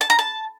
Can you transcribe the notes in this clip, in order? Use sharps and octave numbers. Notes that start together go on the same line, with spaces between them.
A5
A#5
A5